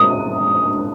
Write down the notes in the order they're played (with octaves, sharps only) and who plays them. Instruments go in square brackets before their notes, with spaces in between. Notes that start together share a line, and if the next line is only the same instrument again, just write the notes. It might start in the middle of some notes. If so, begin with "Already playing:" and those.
Already playing: [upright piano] D#6